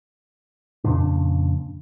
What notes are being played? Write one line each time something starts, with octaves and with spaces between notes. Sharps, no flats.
F2 A#2 C#3 D4